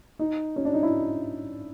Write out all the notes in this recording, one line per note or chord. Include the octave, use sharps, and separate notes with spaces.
D#4
C#4
D4
D#4
E4